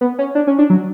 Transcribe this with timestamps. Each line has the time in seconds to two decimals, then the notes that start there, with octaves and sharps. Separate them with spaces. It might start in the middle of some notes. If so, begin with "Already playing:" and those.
0.01 B3
0.19 C#4
0.35 D4
0.47 C#4
0.59 D4
0.70 F#3